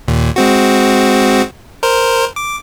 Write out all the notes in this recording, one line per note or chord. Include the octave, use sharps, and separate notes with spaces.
D#2 A#2
G#3 C4 F#4
A#4 C5
D6